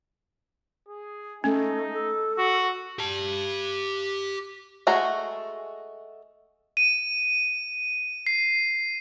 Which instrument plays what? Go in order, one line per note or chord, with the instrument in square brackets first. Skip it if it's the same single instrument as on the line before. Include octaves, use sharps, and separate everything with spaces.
[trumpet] G#4
[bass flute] A3 [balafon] C#4 [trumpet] D#4
[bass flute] A4
[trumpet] F#4
[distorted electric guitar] G4 A5
[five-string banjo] G#3 A3 F#4 G#4 A#5
[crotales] D#7
C7